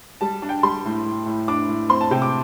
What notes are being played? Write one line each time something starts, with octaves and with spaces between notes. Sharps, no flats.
G3 A5
D4
G5
G3 C6
A2
A2
A2
D4 D6
A2
C4 C6
A5
C3 G5
D6